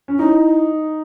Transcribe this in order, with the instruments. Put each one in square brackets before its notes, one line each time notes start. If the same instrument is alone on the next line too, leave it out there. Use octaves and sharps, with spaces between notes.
[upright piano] C#4
[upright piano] D#4 [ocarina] E4